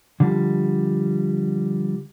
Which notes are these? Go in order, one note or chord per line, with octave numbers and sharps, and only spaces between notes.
D3 F3 G3